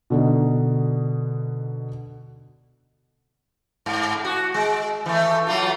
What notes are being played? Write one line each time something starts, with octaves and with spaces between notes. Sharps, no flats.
B2 D3 D#4
G#2
F#4
G#3
E3 A3
F#3 A3 F4